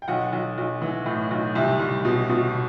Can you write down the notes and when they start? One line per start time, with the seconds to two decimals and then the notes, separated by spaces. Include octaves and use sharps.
0.02 G5
0.08 B1 F#5
0.32 B1
0.58 B1
0.82 E3
1.06 A2
1.31 B1
1.55 C2 E5
1.80 C2
2.05 B2
2.29 B2